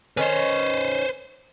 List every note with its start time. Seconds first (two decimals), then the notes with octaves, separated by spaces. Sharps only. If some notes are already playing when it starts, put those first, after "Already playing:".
0.17 D#3 C#4 B4 C5